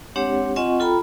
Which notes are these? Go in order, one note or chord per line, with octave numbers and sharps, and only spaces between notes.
G#3 C4 D4 G4 C#5 F#5
C4 F4 D#5 F#5 G#5 C#6
F4 A4 G5 A#5 B5